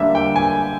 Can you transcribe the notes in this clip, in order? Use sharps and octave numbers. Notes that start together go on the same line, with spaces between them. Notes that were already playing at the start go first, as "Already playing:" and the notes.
Already playing: D3 G3 A#3 E5
G5
G#5